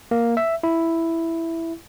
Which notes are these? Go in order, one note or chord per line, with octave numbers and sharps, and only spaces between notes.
A#3
E5
E4